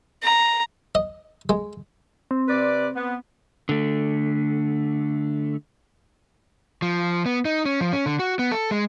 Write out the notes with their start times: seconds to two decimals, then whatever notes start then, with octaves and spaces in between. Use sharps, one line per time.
0.23 A#5
0.95 D#5
1.49 G#3
2.31 C4
2.49 C3 B4 D5
2.95 B3
3.69 D3 A3
6.82 F3
7.26 B3
7.45 D#4
7.65 C#4
7.81 F3
7.93 C#4
8.06 D3
8.20 F#4
8.39 B3
8.52 A4
8.71 G#3